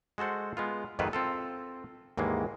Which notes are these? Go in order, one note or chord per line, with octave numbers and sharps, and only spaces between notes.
G#3 F#4 A4 C5 F#5
G#3 B3 F4
F2 G#2 D#3 E4 F4 B4
C4 F4 A4
D#2 G#2 E3 G#3 A#3